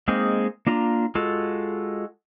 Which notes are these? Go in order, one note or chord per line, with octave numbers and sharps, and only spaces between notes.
G#3 A#3 C4 D#4 G#4
A#3 D4 F4 A#5
G#3 F4 F#4 A4